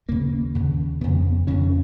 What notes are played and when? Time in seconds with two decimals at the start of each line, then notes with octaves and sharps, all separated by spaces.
0.08 D#2 C#3 A#3
0.55 D#2 C#3
1.01 F2 C#3 B3
1.47 F2 C#3 C#4